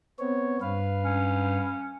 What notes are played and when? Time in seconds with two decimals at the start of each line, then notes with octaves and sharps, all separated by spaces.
0.19 B3 C4 C#5
0.62 G2 B4 F5
1.03 C#4